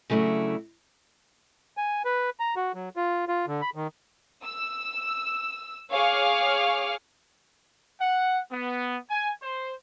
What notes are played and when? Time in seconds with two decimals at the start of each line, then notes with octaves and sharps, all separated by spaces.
0.10 C#3 F#3 A3 D4 E4
1.77 G#5
2.05 B4
2.40 A#5
2.56 F#4
2.74 F#3
2.96 F4
3.28 F4
3.47 D3
3.61 B5
3.75 D#3
4.44 E6
5.91 G#4 C#5 F5 C#6 D6 F6
8.00 F#5
8.52 B3
9.10 G#5
9.42 C5